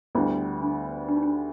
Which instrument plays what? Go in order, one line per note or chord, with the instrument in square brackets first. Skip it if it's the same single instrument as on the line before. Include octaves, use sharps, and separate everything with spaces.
[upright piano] D2 D3 G3 B3 [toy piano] E4
[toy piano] D4
D4
D#4
D4